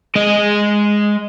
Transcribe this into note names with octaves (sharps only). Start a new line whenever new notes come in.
G#3 D#5